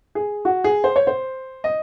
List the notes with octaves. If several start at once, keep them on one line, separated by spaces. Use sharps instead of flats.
G#4
F#4
G#4
C5
C#5
C5
D#5